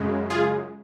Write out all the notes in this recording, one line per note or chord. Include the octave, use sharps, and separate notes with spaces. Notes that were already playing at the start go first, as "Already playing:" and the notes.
Already playing: F#2 C#3 G#3
F4 G#4